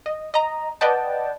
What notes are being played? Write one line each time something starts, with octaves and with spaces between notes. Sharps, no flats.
D#5
D#5 A#5
B4 D5 D#5 F#5 G5 A5